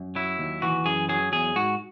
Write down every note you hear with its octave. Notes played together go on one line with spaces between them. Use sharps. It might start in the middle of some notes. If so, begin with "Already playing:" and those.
Already playing: F#2
F#3 E4
D#2
E3 F#4
F#2 G#4
F#3 G#4
E2 G#4
G#2 F#4